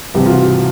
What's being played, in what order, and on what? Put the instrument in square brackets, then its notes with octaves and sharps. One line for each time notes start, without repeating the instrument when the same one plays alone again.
[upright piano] C2 C3 E3 G4
F4
F#4